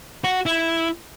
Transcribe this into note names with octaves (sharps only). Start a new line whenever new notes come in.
F#4
E4